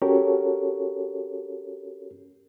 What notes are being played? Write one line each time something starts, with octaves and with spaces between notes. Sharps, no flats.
C#4 F#4 G4 A4 A#4 C#5